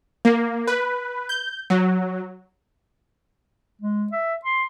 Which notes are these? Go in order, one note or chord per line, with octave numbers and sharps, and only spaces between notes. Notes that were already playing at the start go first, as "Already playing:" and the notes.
A#3
B4
G6
F#3
G#3
E5
C6